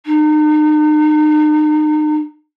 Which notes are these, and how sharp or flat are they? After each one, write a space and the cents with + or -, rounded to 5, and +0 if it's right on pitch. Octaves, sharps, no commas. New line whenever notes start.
D#4 -40